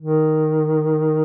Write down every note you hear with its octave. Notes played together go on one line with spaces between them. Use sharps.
D#3